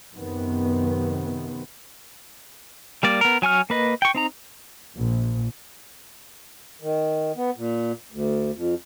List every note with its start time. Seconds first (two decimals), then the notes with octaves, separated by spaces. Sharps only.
0.13 F#2 C3 D#3 B3
3.03 G3 A#3 D5
3.21 B3 A#4
3.42 F#3 G#5 C#6 F6
3.70 A#3 B4 D#5
4.02 G5 C#6
4.15 C4 D#4 A#5
4.97 A#1
6.82 D#3
7.37 B3
7.57 A#2
8.12 D2
8.55 F2